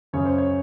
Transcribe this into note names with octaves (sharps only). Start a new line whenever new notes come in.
F#2 C#3 C#5
C5
C#5